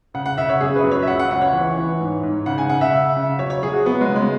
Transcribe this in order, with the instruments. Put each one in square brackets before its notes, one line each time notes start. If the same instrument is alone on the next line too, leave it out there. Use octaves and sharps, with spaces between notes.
[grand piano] C#3 F#5
F#5
C#3 E5
C#5
F#2 G#4
B4
F#2
C#5
E5
C#2 F#5
F#5
C#2 F#5
C#5
E3
E3
G#2
G#2
C#3 F#5
G#5
C#3 F#5
E5
C#3
C#3
F#3 C#5
C#5
F#3 G#4
F#4
F#3 B3
G#3
C#3
G#3